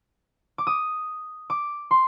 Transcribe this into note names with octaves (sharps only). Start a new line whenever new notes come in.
D6
D#6
D6
C6